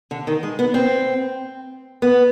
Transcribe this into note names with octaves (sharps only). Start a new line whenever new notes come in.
D3
D#3
G#3
B3
C4
B3